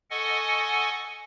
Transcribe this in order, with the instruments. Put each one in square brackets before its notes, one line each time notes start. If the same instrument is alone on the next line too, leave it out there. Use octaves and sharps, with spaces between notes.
[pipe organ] A4 D#5 F#5 G#5 C#6